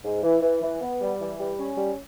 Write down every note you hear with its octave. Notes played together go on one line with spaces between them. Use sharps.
G#2
E3
E3
E3
B3
G3
E3
G3
C#4
G3